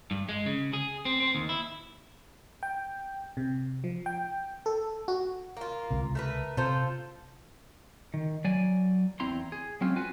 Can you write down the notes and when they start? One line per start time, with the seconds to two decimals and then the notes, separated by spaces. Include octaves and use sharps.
0.11 G2
0.29 G#3
0.46 C#3
0.73 G#4
1.05 C4
1.20 C4
1.35 D#2
1.49 E4
2.63 G5
3.37 C3
3.84 F3
4.06 G5
4.66 A4
5.08 F#4
5.57 A#3 F4
5.90 C#2 C3
6.15 A3 A#4 B4
6.57 C3 F4 A4 C5
8.14 D#3
8.44 F#3 D5 G#5
9.20 E2 C4 E4 A#5 C6
9.52 G#4
9.81 F#3 G#3 C4 C#4 F4
9.96 F4 F#4 B4 G#5